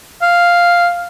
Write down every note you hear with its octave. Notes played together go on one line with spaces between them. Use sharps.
F5